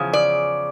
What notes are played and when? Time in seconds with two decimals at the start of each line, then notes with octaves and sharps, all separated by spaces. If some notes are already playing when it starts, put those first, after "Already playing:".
Already playing: E2 C#3 F3
0.13 D5